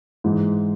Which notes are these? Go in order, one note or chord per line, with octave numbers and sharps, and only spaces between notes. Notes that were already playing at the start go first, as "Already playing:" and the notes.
G#2 E3 G#3